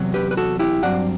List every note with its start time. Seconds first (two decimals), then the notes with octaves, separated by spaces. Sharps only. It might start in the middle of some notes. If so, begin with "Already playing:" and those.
Already playing: E2 C3 F#3
0.14 G4 B4
0.31 B4
0.37 F#4 A4
0.59 E4 G4
0.82 G2 F#3 C4 D5 F#5